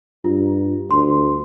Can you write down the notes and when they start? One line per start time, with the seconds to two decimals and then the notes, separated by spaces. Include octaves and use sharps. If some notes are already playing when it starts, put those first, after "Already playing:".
0.24 G2 F4
0.91 D2 C6